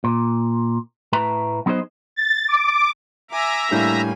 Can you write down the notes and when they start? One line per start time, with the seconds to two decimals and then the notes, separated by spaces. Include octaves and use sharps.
0.04 A#2
1.13 A2 A3 B4 E5 A#5
1.66 F#3 B3 D#4 G#4 C5 D#5
2.16 A6
2.48 D6
3.31 E5 G#5 A#5 D6
3.71 A2 G3 A#3 D4 E4 G#5 G6